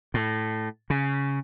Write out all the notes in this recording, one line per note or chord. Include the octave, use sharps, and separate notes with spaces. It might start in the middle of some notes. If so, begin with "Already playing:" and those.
A2
C#3